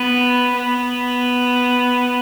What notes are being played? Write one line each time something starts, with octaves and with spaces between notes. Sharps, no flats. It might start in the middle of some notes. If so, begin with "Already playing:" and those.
Already playing: B3
B3